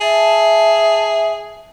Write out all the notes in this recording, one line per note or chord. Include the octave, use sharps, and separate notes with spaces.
G#4 E5 A5